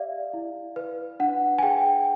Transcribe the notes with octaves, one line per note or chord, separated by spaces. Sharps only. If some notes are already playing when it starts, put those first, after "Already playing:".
Already playing: G4 D5 E5 F5
E4
B4
D4 F#5
G#5
G#4 G5